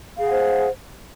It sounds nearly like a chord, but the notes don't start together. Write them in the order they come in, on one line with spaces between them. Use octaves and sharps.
F5 G#4 F#5 C5